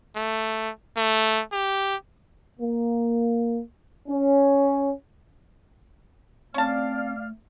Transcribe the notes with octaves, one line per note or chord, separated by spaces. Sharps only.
A3
A3
G4
A#3
C#4
A3 C4 C#4 D5 F5 A5 F6